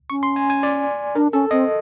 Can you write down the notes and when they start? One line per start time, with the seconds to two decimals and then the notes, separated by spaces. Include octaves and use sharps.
0.10 C#4 C#6
0.23 C6
0.36 G#5
0.50 G#5
0.63 D5
1.15 D4 A#4
1.33 C#4 A4
1.51 C4 D#5